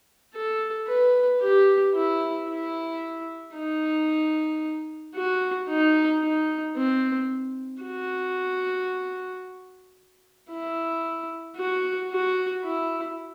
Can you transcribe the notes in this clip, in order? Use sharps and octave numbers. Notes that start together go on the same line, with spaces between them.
A4
B4
G4
E4
E4
D#4
F#4
D#4
D#4
C4
F#4
E4
F#4
F#4
E4